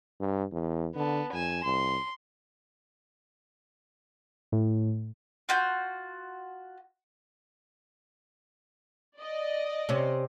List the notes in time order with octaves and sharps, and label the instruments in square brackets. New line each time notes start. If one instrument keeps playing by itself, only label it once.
[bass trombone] G2
E2
[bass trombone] D3 [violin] B3 A5
[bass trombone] F2 [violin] G#5 E7
[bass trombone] C2 [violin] C6
[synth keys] A2
[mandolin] F4 F#4 G6
[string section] D5 D#5
[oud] C3 C#4